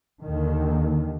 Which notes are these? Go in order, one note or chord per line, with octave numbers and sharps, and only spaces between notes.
D#2 D3 D#3